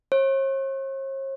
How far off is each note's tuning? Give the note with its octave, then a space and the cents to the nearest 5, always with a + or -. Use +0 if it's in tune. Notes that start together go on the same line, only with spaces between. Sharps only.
C#5 -45